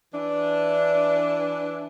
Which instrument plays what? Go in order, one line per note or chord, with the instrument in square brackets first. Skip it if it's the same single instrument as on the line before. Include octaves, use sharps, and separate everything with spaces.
[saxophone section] E3 D4